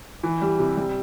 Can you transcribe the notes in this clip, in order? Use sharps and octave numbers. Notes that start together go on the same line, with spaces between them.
E3
G3
C3
G3